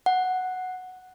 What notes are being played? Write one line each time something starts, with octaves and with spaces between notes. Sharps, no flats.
F#5